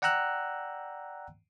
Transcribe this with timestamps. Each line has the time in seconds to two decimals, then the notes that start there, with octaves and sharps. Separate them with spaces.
0.02 D5 F#5 G5 A#5 E6 F#6